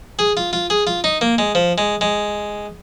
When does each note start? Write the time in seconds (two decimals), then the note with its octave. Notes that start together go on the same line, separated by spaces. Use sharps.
0.19 G#4
0.37 F4
0.53 F4
0.70 G#4
0.87 F4
1.04 D#4
1.21 A#3
1.38 G#3
1.55 F3
1.78 G#3
2.01 G#3